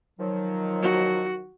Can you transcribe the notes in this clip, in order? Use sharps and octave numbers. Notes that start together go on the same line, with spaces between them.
D#3 F3 F#3
F#4